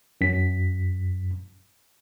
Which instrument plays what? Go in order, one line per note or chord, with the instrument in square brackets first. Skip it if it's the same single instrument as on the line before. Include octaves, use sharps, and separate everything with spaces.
[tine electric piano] F#2 B6